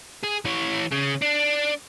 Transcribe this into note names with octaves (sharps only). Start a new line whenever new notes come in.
G#4
E3 C#5
C#3
D4